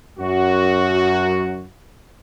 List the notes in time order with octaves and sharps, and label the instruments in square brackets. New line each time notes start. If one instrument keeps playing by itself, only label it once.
[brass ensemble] F#2 F#4